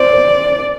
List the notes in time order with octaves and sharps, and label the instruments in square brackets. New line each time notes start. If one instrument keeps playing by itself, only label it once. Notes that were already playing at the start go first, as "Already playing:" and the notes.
Already playing: [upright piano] C5 [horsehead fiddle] D5
[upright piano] C5